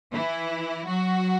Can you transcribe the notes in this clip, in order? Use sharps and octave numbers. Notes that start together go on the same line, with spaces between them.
E3 E4
F#3 F#4